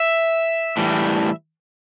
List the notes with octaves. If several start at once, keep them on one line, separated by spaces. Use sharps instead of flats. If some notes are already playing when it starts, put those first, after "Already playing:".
Already playing: E5
A2 E3 G3